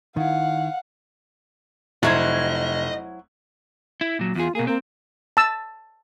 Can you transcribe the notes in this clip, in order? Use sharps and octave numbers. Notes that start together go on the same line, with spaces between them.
D#3 E4 F5 F#5
F1 F#3 E4 C5 D#5 G#6
E4
A#2 F#3
E2 F4 G#4
B2 A#3 G#4
A#3 C4
A5 E6